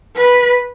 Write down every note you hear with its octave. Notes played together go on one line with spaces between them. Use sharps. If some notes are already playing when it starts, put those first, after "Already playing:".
B4